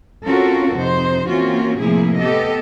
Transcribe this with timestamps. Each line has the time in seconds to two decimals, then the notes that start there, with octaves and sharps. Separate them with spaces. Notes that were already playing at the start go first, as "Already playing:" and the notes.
0.25 C4 C#4 F4 F#4 A4 A#4
0.76 F2 C3 D#4 C5
1.30 E3 A#3 C4 C#4 F4 F#4
1.82 A2 C3 F3 A#3 E4 G#4
2.20 B3 G4 A4 D#5